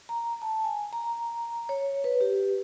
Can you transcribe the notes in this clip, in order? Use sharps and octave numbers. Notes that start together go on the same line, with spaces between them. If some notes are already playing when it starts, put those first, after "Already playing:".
A#5
A5
G#5
A#5
C#5
B4
G4